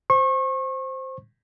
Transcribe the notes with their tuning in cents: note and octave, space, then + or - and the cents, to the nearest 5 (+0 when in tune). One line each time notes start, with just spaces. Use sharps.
C5 +0 C#6 -35